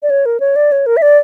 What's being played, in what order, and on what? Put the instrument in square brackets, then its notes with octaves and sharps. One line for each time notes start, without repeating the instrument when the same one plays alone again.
[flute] D5
C#5
A#4
C#5
D5
C#5
A#4
E5
D5